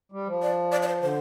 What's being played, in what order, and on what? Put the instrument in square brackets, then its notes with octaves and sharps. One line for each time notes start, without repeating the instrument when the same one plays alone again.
[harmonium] G3
F3
[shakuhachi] D5
D5
D5
C5
[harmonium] D3 [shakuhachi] C5